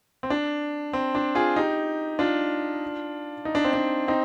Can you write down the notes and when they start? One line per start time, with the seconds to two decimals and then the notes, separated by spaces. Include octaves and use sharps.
0.23 C4
0.30 D4
0.93 C4
1.15 D4
1.35 F4 G#4
1.56 D#4 G4
2.19 D4 F4
3.45 D#4
3.55 D4
3.64 C4
3.73 D4
4.08 C4 D#4